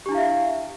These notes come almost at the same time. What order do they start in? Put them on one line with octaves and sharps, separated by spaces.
G4 D4 E4 F5 E5